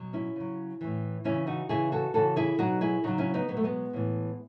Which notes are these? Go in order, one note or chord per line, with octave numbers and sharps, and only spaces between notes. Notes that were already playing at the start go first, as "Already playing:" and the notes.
Already playing: B2 F#3
C#4 E4
C#3 F#3
A2 E3
C#3 E3 C#4 E4
D#4 F#4
C#3 E3 E4 G#4
F#4 A4
C#3 E3 F#4 A4
E4 G#4
B2 F#3 D#4 F#4
E4 G#4
C#3 F#3 D#4 F#4
C#4 E4
B3 D#4
B2 F#3 B3
A3
G#3 B3
A2 E3